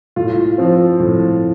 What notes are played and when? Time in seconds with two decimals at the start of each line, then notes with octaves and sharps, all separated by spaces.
0.16 A2 F4
0.58 F3 C4
1.00 A2